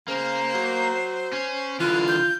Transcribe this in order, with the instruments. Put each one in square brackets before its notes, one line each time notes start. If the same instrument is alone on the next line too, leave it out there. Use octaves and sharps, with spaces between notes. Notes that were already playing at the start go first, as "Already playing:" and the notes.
[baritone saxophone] C#3 [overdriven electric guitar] A#3 [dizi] C5
[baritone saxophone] F#3
[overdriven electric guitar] C#4
[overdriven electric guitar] D3 E3 [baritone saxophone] F4 [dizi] F#6
[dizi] G6